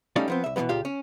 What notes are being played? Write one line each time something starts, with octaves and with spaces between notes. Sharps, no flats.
G3 A3 C#4 D#4 D5 F5
F3 B3 C4
C2 E5
B2 E3 F3 G#3 B3
C#2 A#2 F4 G4 F5
C#4